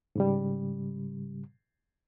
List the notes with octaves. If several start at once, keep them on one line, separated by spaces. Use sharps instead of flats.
G#2 C#3 G3